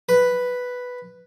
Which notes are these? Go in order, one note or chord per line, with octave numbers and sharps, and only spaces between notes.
B4